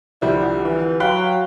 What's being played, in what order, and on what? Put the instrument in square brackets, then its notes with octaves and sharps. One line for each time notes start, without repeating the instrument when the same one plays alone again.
[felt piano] C2 D3 F3 [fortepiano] G3 [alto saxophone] E4
[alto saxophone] E3
[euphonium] F#3 [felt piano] F5 B5 F#6 [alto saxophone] G5